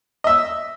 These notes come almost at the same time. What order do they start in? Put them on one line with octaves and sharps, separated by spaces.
D#5 E5 E6